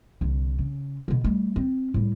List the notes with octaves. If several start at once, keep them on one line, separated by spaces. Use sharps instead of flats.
C2 D3
C#3
B2 D3
G3 A3
C4
A2 G3